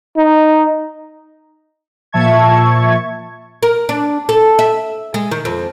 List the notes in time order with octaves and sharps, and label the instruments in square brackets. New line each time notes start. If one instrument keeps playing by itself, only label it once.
[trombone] D#4
[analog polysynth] A#2 F3 E5 A5 C#6 G#6
[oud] A#4
D4
A4
E5
G#3
D#3
F2